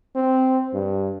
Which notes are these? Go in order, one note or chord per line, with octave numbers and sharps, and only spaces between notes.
C4
G2